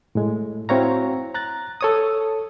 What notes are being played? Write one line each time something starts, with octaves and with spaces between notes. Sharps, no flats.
A2 G#3
C4 E4 F#4 C#5 F5 A#5
A#5 F#6 A6
A4 C#5 D#6